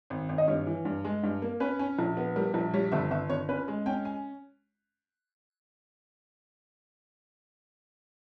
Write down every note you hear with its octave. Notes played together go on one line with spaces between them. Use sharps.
G#1
G#1
D#5
G2 C#5
E3
G2
G#3
G2
A#3
C#4 B4
C#4
A#1
B3
G3 A#4
A#1
G3 C#5
G1 E5
G1 E5
G1 C#5
C#4 B4
G#3
C#4 G5
G#5